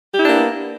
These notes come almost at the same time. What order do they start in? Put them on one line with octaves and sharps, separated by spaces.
G4 E4 D4 A#3 B3